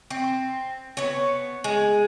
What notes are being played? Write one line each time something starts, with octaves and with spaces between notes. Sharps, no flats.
C4
B3 C#5
G#3